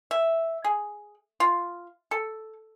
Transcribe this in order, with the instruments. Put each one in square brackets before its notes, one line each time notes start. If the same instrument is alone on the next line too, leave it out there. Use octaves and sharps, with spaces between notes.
[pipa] E5
G#4
F4
A4